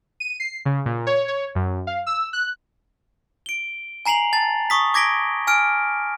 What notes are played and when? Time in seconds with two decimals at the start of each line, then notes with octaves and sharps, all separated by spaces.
0.20 D#7
0.40 C7
0.65 C#3
0.86 A#2
1.07 C#5
1.28 C#5
1.55 F#2
1.87 F5
2.07 E6
2.33 F#6
3.46 D7 G7
4.06 G#5 A#5 C7 F7 F#7
4.33 A5 A6
4.70 C#6 D#6 B6
4.94 D6 G#6 A#6 B6 D7 G7
5.47 G#5 F6 D7